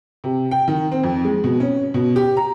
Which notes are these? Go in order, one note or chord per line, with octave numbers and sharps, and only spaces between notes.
C3
G5
D#3
C4
F2
G#3
B2
C#4
B2
G4
A#5